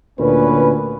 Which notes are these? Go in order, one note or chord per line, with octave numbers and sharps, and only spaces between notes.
D2 A#2 C#4 B4